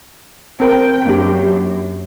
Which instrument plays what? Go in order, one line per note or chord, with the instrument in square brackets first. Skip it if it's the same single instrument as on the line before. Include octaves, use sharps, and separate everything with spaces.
[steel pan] C4 A#4 [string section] G5
[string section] F#2 [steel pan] A#3 D4 G4